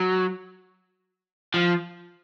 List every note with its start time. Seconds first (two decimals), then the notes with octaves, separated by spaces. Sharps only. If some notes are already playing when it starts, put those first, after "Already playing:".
Already playing: F#3
1.54 F3